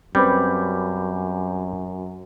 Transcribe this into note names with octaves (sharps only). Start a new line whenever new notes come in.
F#2 G3 C4 C#4 B4 B5 D6 G6